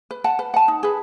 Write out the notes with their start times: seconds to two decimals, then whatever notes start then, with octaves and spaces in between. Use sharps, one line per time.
0.11 B4
0.24 F#5 A5
0.39 B4
0.54 F#5 A5
0.68 D#4
0.83 G#4 B4